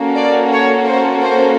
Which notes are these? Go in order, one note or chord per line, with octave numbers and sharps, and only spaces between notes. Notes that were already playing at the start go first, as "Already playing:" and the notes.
Already playing: A#3 C#4 F#4 A4
D5
C#5
C5
C5